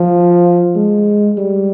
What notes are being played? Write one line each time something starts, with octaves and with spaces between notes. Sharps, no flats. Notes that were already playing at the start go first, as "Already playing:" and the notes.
Already playing: F3
G#3
G3